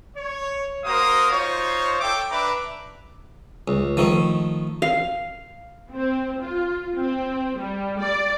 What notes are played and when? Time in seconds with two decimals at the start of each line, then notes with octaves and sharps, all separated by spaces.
0.16 C#5
0.85 A#3 F#4 A#4 C5 F5 D#6
1.31 D#4 F4 C5 C#5
2.00 A4 E5 G5 D6
2.30 D4 B4 E5 A#5 D6
3.68 C#2
3.97 D#3 F3 A3
4.82 F5
5.93 C4
6.40 F4
6.96 C4
7.56 G3
8.00 D5